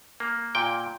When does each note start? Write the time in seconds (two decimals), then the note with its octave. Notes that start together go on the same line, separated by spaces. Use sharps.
0.20 A#3
0.55 A#2 G5